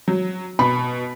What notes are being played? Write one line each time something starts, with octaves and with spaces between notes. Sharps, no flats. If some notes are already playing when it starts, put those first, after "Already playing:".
F#3
B2 B5